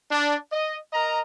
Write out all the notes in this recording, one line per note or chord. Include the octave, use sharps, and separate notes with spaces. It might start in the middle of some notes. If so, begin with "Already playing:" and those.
D4
D#5
A#4 D#5 A#5